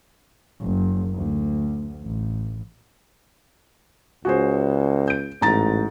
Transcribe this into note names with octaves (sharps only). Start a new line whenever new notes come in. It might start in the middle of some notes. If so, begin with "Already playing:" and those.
F#1
D2
A1
C#2 F#4 G#4 C5
G6 D7
A1 G#2 A#5 A6